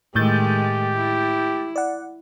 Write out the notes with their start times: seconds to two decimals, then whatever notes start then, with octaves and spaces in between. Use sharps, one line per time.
0.15 A2 D#3 G#3 A3 G4 G6 A6
0.94 E4
1.76 D5 F#5